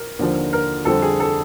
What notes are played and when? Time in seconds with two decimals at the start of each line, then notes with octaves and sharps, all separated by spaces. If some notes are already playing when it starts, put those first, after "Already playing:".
Already playing: A#4
0.19 D#2 D3 F3
0.53 A#4
0.85 F2 D3 G3 C4 A4
1.02 G#4
1.20 A4